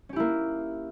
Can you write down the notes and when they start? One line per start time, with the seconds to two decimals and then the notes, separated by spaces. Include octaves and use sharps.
0.09 C#4
0.13 G4
0.16 E4
0.20 A#3